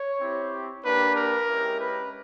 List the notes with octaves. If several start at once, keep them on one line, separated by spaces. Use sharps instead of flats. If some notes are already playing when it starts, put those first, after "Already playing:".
Already playing: C#5
C4 E4 G4
A#3 D4 G4 B4
A#4
G#3 C#4 E4 G4
B4